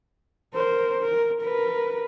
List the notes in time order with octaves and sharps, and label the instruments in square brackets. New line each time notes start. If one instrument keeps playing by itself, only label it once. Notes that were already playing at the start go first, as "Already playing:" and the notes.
[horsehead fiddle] A#4 C5
A#4
A#4 B4